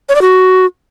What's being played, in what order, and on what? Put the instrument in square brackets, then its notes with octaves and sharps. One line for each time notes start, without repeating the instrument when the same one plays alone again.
[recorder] C#5
D5
F#4